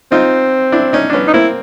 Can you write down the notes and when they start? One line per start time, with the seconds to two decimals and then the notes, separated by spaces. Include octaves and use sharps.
0.11 C4 D#4 F4
0.72 D4 E4
0.93 C#4 D#4
1.10 D4
1.13 B3 C#4
1.28 D#4
1.34 A#3 C4 E4